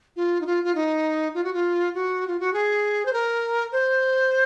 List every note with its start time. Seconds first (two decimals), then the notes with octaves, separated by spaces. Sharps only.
0.16 F4
0.41 D#4
0.46 F4
0.64 F4
0.75 D#4
1.34 F4
1.44 F#4
1.53 F4
1.94 F#4
2.27 F4
2.40 F#4
2.53 G#4
3.05 C5
3.13 A#4
3.72 C5